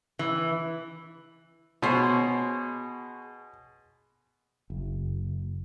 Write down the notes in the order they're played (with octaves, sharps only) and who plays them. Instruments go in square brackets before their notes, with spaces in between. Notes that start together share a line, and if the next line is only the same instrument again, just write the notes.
[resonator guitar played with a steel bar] E3
[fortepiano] B2 [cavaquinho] G#4 C5 C#5
[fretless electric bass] F#1